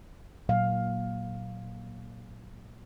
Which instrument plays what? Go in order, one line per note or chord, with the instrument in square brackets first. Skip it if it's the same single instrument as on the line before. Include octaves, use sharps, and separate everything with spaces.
[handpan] A#2 F#3 A#3 F5